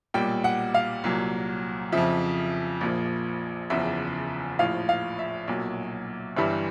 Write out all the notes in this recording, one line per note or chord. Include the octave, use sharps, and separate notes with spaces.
B1 A#2 G3 G5
F#5
F5
C2 A#2 F#3
F2 C#3 F3 E5
A#1 A#2 F3
F#1 E2 C#3 F3 E5
A#1 A2 F3 F5
F5
E5
B1 A#2 F#3
G1 G2 E3 G3 E5